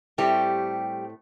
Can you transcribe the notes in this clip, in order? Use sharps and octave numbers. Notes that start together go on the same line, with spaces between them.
A2 G3 A3 C4 G4